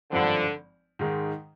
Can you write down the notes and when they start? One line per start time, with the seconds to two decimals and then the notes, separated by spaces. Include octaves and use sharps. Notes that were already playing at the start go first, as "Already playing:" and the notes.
0.12 G#1 G2 D3 F3 C4
0.99 G#2 D#3 G#3